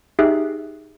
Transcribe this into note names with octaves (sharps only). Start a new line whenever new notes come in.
D#4 G4 G#4 E5 F#6